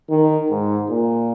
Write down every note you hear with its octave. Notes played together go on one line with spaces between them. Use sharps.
D#3
G#2
A#2